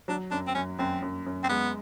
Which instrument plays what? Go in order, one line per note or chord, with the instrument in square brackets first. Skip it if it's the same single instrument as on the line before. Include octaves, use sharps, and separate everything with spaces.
[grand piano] F#3 [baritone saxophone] D4
[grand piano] F#2 [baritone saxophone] D4
[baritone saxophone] C4
[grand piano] F#2 [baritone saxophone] C#4
[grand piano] F#2 [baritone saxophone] C4
[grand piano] F#2
F#2
[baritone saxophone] C4
[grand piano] G#3 [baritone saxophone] B3